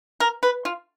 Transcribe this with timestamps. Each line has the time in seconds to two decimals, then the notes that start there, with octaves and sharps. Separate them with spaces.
0.20 A#4
0.43 B4
0.65 F4